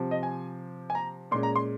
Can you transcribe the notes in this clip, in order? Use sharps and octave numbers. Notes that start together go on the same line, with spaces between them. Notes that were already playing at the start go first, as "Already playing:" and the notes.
Already playing: C3 F3 C4
D#5
G#5
G#5
A#5
A#2 G#3 C#4 C6
A#5
C6